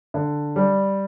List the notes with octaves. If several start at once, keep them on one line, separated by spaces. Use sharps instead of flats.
D3
G3